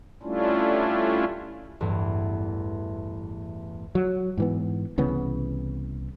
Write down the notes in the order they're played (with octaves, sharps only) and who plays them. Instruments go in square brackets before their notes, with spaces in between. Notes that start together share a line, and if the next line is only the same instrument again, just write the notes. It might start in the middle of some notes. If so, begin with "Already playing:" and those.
[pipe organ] G3 A3 C#4 D4 E4 F4
[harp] A1 E2 G2
[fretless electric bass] F#3
G#2 E3 B3
C2 C#3 E3 B3